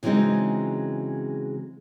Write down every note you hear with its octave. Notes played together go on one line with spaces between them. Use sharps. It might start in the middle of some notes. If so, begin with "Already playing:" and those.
C#3 E3 F#3 G#3 C4 D#4